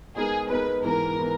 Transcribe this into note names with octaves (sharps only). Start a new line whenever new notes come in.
G#3 B3 D#4 G#4 A#4
G#3 B3 D#4 A#4 B4
G#2 E3 B3 A#4
E3 B3